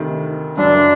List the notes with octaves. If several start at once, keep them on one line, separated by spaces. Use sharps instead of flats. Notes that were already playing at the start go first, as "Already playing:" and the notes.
Already playing: D2 C3 D#3
F#1 F#2 F#3 D4